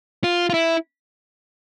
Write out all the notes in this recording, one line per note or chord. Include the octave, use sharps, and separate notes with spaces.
F4
F4
E4